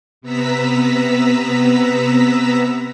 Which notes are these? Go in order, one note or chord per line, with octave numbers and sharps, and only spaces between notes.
C3 B3 B4 A#5 E6 B6